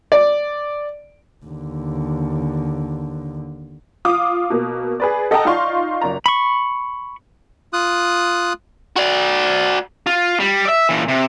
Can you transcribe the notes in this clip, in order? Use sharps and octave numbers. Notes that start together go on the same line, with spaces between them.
D5
D#2 D3
F4 D6 D#6
B2 A#3
G#4 B4 D5
A4 D#5 F#5 G5 A5 A#5
D#4 F4 D5 F5 C6 C#6
F#1 D5 A#5
B5 C#6
F4 D#6 F#6
F#4 D5
F4
G3
D5 E5
A#2 E3
C3